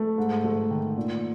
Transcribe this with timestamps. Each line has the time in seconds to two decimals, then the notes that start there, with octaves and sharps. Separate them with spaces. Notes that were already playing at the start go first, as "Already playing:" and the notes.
Already playing: A3
0.18 G#2
0.44 A3
0.70 D#3
0.97 A#2